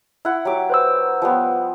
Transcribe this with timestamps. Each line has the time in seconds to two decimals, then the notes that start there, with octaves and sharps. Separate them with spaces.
0.25 E4 F#5
0.45 F#3 G4 D6
0.70 B4 C5 E6
1.22 F3 G3 B3